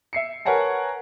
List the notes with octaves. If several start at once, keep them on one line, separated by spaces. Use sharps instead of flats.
E5 C7 C#7
A#4 B4 C#5 F#5 G#5 A5